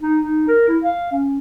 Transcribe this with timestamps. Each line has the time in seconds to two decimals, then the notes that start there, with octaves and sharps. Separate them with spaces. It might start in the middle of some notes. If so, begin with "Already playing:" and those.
0.02 D#4
0.21 D#4
0.47 A#4
0.68 E4
0.83 F5
1.12 C#4